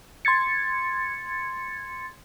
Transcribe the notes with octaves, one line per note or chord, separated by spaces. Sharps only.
C6 G#6 A6 C#7